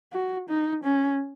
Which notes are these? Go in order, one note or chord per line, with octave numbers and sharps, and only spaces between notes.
F#4
D#4
C#4